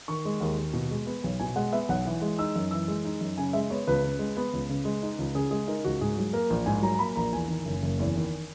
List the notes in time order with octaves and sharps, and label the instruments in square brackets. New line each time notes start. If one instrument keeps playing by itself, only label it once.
[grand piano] D#3 C#6
G#3
D#2
D#2
B2
G#3
B3
B1
B2 G#5
G#3 F#5
B3 E5
B1 F#5
E3
G#3
D#4 E6
F#2
E3 E6
G#3
D#4
F#2
C#3 G#5
G#3 E5
B3 C#5
C#2 B4
C#3
G#3
B3
C#2
C#3
G#3
D#4
C#2
C#3 G#4
G#3 G#4
D#4 A#4
C#2 F#4
G#2 G#4
F#3
A#3 A#4
A#1
G#2 G#5
F#3 A#5
A#5
A#3 B5
A#1 A#5
E2 G#5
D#3
F#1
F#1
E2
D#3